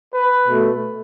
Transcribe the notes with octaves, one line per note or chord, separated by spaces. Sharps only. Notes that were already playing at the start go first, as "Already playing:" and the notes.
B4
B2 A3